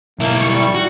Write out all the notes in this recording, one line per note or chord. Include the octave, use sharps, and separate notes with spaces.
B1 A#3 E4
G3 C#6
F#4